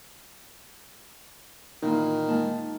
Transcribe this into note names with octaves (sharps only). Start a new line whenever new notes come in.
A#2 D#3 E3 A#3
G#3 A#3 A5